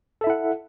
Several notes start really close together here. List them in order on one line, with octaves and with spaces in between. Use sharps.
A4 E5 E4 F#5